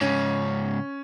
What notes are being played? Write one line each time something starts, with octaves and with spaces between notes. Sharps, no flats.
G#2 C#3 C#4